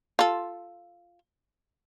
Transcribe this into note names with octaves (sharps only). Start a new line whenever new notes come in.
F4 A4